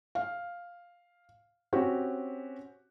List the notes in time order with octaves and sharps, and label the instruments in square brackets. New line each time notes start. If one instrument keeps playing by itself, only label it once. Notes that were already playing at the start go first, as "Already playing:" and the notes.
[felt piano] F5
C4 C#4 F#4 G4